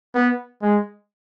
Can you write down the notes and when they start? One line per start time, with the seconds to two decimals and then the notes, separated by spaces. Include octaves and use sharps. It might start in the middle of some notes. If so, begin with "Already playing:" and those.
0.15 B3
0.62 G#3